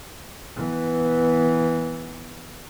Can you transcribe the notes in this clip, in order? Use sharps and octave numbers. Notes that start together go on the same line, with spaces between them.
E3 B3